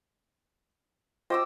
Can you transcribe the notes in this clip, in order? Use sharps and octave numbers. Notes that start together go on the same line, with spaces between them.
F4 C5 D#5 G5 D6 E6